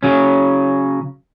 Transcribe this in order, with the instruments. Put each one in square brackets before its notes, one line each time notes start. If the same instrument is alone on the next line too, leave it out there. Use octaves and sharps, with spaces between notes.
[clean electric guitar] C#3 F#3 C#4